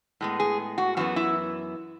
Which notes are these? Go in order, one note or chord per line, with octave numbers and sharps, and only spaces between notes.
A2 G#3 B3
G#4
F#4
F#2 E3 B3 F#4
E4